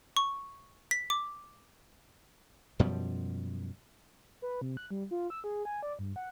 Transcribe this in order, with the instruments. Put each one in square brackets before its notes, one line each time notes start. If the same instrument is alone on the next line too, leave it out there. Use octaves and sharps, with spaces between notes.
[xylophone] C#6
B6
D6
[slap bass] F#2 B2 F3 G3
[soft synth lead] B4
C3
F#6
G3
F4
E6
G#4
G#5
D5
G2
F#5